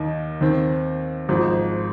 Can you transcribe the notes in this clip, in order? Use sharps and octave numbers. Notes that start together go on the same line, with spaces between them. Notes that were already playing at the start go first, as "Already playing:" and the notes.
Already playing: D#2 D#3 A#3 D#4
D#2 D#3 C4
G#1 G#2 F3